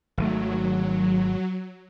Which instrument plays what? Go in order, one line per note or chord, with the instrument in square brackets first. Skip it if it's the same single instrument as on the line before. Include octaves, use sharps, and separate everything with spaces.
[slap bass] G#1 D#3 A3 [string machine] F#3